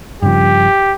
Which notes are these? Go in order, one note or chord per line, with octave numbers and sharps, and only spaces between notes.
G2 C#3 F3 G4